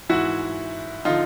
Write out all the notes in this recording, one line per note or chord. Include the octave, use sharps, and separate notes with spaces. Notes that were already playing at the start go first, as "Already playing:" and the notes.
G#2 E3 E4 F#4
D3 F3 D#4 F4